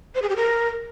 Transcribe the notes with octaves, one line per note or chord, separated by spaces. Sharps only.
C5
G#4
G4
A#4